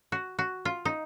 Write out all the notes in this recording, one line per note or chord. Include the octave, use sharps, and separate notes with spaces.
F#4
F#4
F4
D#4